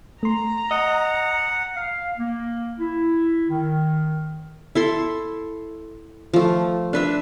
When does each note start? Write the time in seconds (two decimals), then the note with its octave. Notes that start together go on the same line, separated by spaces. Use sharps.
0.23 A3 A#5 C6
0.71 D#5 F#5
1.75 F5
2.18 A#3
2.79 E4
3.49 D#3
4.75 E4 A4 C6
6.33 F3 A3
6.93 D4 B4 E5